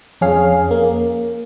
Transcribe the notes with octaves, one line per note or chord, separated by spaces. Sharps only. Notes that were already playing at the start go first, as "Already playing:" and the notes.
F2 C#4 G#4 F5
A#3